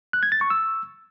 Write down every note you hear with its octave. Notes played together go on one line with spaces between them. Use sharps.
F#6
G#6
A6
C#6
E6